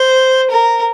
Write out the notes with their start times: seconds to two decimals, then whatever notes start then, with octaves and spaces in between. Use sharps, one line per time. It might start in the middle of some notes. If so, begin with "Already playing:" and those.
Already playing: C5
0.51 A#4